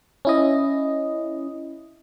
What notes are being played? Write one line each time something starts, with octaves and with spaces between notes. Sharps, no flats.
C#4 E4 D#5